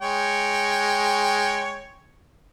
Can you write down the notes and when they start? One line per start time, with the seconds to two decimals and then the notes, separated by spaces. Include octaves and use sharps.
0.02 G#3 C#5 G5